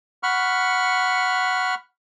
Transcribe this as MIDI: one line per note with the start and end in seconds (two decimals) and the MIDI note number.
0.23 1.75 78
0.23 1.75 83
0.23 1.75 85
0.23 1.75 89